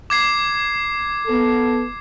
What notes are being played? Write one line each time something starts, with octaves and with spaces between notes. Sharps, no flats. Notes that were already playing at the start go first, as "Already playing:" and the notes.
D6 G#6 C7
B3 A4